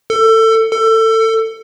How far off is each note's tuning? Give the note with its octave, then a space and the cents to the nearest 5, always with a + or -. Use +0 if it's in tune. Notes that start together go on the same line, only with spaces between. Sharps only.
A4 +25
A4 +25